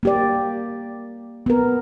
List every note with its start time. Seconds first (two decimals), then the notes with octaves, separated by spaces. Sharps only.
0.03 A#3 G4 D5
1.46 B3 A#4